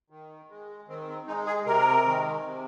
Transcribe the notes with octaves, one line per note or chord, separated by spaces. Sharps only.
D#3
G#3
D#3 C4
C4
G#3 D#4
G#4
C3 A#4
D#3 G#3
C3